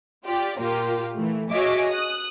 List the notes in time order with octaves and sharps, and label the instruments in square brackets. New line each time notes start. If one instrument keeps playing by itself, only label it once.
[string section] F4 G4 D5
A#2 A#3 F4 G4
E3 A3
F#4 G#4 C#5 D#5 E5 D6
D#6 F#6